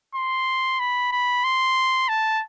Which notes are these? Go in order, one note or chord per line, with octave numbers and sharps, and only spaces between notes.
C6
B5
B5
C6
A5